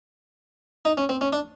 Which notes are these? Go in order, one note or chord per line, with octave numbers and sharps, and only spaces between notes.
D#4
C#4
C4
C#4
D4